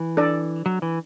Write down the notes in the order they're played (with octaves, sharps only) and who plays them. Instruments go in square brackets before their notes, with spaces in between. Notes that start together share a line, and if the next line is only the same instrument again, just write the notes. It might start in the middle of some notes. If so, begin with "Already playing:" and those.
Already playing: [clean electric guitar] E3
[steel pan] D4 A4 D5
[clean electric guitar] F#3
E3